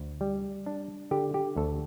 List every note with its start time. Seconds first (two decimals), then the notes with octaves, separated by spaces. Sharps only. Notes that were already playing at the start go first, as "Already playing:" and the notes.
Already playing: D2
0.21 G3
0.66 D4
1.11 D3 G4
1.34 G4
1.56 D2 A4